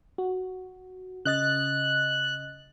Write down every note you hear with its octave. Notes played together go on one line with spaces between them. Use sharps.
F#4
C#3 D#5 F#6 A6